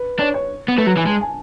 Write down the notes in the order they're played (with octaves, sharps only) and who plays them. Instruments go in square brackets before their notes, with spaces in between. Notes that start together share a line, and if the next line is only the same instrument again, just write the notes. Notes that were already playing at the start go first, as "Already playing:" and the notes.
Already playing: [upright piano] B4
[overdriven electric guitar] D4 [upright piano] C#5
[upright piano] C#5
[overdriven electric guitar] B3
[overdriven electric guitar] A3 [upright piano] B4
[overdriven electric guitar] F#3
[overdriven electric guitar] E3 [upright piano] G#5
[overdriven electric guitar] G#3 [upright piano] A5
[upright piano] G#5